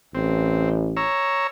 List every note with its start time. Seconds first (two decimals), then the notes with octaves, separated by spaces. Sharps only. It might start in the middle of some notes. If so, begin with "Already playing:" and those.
0.15 A1 C4
0.97 C#5 A#5 E6